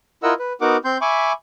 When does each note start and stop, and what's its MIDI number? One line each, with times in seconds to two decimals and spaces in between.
0.23 0.34 64
0.23 0.34 65
0.23 0.34 70
0.23 0.34 75
0.23 0.34 78
0.23 0.34 88
0.39 0.53 71
0.61 0.77 59
0.61 0.77 63
0.61 0.77 66
0.61 0.77 70
0.61 0.77 78
0.61 0.77 86
0.85 0.98 60
0.85 0.98 84
0.85 0.98 91
1.01 1.32 76
1.01 1.32 80
1.01 1.32 83
1.01 1.32 85
1.01 1.32 86